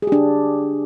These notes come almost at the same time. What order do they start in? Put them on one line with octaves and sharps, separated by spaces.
G#4 G4 D4